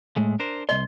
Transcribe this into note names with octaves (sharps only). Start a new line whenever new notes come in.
A2 G#3 A3
D4 A#4 C5
C2 D#5 C6